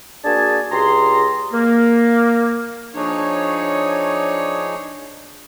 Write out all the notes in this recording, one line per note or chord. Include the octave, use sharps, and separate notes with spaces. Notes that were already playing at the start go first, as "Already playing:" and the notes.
A#3 D4 F#4 G#4 G#5 A5
C#2 G4 G#4 A#5 C6
A#3
F3 D4 D#4 G#4 C#5